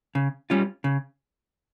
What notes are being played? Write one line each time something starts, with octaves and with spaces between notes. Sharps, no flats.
C#3
G3 C#4 F4
C#3